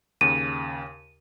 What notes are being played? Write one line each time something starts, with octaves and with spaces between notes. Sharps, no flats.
D#2 C#3 D#7